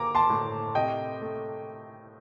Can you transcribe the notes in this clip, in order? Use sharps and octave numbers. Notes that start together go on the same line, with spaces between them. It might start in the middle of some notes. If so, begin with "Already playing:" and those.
Already playing: A#3 A#5 D6
A5 C6
A2
C3 D#5 G5
A3